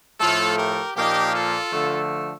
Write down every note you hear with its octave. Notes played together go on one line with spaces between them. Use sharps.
A2 F3 A3 F4 A4
G4 A#4
A#2 F3 A#3 D#4 G4
F4 A4
D3 F3 A3